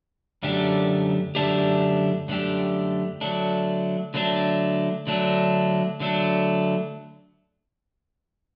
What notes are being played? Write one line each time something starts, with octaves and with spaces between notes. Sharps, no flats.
F#2 D3 A3 D4 G4
F#2 D3 A3 D4 G4
F#2 D3 A3 D4 G4
D3 F#3 A3 D4
D3 F#3 A3 D4
D3 F#3 A3 D4
D3 F#3 A3 D4